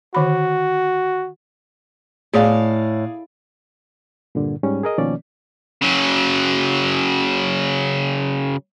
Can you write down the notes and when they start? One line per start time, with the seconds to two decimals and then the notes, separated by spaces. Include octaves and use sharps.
0.15 D3 D#3 F#4 B5
2.33 A2 G#4 D5 F5
4.35 G2 A#2 D3
4.63 G#2 G3 C#4
4.83 G#4 A#4 D#5
4.98 B2 D#3 F3 A#3 C#4 D5
5.82 C#3 F#3